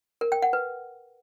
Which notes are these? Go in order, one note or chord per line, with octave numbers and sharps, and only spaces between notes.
A#4
G5
F#5
B4